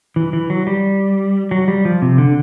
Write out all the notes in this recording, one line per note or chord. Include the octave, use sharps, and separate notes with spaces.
E3
E3
F#3
G3
F#3
G3
F3
C3
D3